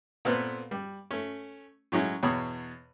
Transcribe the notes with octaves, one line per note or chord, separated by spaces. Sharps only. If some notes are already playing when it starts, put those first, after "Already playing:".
A#2 A3 B3 C4 A4 B4
G3
A3 C#4
A2 F#3 G#3 C#4 E4
E2 B2 C#5 B5 D#6